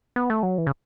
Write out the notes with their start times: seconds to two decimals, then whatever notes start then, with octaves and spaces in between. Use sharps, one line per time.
0.16 B3
0.30 A3
0.43 F#3
0.58 E3
0.67 C#3